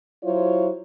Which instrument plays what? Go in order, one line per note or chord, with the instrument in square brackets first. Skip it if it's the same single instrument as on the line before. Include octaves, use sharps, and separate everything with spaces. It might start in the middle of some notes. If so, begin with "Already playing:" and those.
[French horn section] F#3 E4 F4 C5 C#5